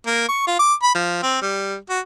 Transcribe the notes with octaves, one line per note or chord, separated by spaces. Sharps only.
A#3
C#6
F4
D6
B5
F3
C4
G3
F#4